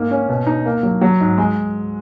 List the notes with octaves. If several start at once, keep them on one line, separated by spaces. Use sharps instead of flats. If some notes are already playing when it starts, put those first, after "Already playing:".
Already playing: G#2 A#3
C#4
B2
D#4
A#3
F#3
F#3
G#2
G#3